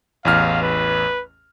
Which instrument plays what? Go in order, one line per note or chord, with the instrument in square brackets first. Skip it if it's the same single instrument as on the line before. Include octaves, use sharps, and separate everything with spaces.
[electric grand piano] A1 E2 F6 [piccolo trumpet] F5
[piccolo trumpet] B4